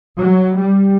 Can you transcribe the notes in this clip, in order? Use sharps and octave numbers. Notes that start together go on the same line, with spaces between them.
F#3
G3